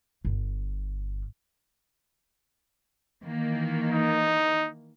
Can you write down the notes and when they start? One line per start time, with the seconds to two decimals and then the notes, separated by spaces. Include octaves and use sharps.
0.25 G1
3.23 D#3 E3 A#3
3.92 D#4